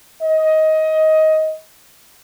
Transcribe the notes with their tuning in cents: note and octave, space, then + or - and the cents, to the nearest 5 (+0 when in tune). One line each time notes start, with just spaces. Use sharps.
D#5 +15